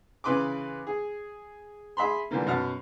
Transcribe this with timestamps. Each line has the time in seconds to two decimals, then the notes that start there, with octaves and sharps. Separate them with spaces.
0.24 C#3 E3 B4 C6 D6
0.87 G#4
1.97 G#4 E5 B5 C6
2.31 D3 E3 F3 G3 A#3
2.46 F#2 B2 F#5 A5 F6